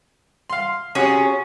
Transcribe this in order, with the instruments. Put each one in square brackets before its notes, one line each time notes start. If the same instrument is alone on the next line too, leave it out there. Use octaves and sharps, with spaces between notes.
[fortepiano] F5 C6
[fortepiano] C3 F#4 G#4 [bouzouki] C#4